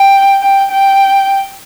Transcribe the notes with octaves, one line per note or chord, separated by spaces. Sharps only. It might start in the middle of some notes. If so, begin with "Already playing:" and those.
Already playing: G5
G5
G5